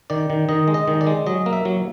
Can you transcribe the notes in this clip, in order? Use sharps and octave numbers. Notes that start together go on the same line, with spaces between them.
D#3 D5
D#3
D#3 D#5
G#3
D#5
D#3
D5
G#3
F#3 D#5
A#3
E5
F#3